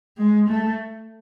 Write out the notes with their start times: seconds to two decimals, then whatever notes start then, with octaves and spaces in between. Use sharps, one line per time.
0.18 G#3
0.49 A3